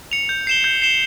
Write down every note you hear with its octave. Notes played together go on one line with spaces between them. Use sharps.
C#7 F7
G6
C7 E7 G7
G6
C7 E7 G7